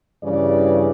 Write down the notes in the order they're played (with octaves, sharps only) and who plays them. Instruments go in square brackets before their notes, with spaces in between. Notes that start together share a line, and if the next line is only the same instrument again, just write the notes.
[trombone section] G2 C#3 E3 [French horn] D5